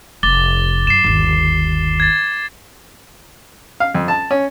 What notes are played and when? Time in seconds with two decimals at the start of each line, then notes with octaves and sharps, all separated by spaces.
0.23 F1 D6 A6 G7
0.87 F#2 C7 E7
1.04 G1 D#2
2.00 G#6 A6
3.80 F5
3.95 F2
4.08 A5
4.31 C#4